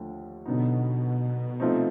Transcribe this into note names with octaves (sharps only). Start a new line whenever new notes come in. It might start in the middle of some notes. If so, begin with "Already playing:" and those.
Already playing: D#2 D3 F3 A3
B2 D3 F#3 B3 D#4
C3 F3 A3 C4 D#4